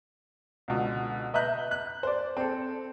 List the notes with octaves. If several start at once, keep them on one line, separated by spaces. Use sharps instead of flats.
C#2 B2 D3
B4 D#5 E5 A#5 F#6 G6
F#6
C5 D5
C4 A4